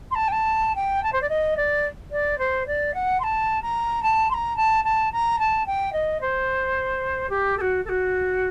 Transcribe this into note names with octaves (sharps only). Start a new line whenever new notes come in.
C6
A5
G5
A5
G5
A5
C5
D5
D#5
D5
D5
C5
D5
F#5
C6
A5
A#5
A5
C6
A#5
A5
A5
A#5
A5
G5
D#5
C5
G4
A4
F#4
A4
F#4